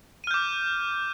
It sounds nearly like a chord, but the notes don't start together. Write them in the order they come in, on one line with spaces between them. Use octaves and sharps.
D#7 F6 G6 D6